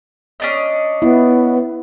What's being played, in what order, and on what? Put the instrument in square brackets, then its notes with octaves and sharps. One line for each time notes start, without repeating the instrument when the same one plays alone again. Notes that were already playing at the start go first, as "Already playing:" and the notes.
[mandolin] C#4 D4 D#5
[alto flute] B3 [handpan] E4